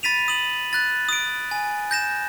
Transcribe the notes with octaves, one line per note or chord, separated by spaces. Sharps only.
B5 A6 B6 D#7 F7
D#6 F#7
F#6 A6
D#6 D7
G#5
G6 A#6 E7